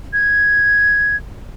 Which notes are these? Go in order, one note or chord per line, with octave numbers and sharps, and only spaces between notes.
G#6